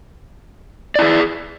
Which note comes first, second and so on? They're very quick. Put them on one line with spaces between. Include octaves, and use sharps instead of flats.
D5 E4 G#4